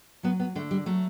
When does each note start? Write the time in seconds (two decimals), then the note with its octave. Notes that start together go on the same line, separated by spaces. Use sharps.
0.23 F#3 B3
0.40 B3
0.55 D3 A3
0.71 G3
0.86 F#3 A3